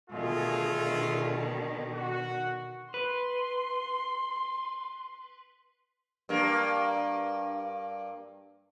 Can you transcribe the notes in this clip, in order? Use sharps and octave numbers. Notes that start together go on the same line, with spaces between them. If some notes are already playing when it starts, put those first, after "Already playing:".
B2 D3 D#3 A3 F4 G#4
F#4
B4 C6
G2 A#3